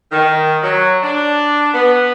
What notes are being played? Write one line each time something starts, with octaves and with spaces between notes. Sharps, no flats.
D#3
F#3
D4
B3